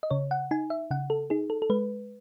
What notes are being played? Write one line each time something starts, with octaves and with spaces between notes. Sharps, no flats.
D#5
C#3 C#5
F#5
D#4 G#5
E5
C#3 F#5
A4
D#4 G#4
A4
A4
G#3 B4